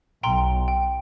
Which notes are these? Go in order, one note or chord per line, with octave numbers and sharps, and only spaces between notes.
B1 G5 A#5 C6
G5